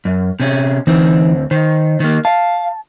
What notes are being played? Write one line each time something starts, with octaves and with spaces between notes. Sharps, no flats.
F#2
C3 C#4
D2 E3 C4 D#4
D#3 C5
D#3 A#3
F5 A5